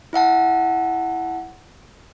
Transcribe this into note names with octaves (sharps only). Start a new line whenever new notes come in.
E4 E5 F#5 A5